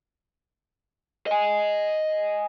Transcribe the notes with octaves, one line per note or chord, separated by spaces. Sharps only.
D#5 G#5